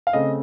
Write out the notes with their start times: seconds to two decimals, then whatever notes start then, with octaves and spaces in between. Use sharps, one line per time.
0.07 F5
0.13 C#3 A3 C4 D#5